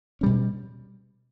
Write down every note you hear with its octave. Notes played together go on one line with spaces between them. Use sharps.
B2 G3 C#4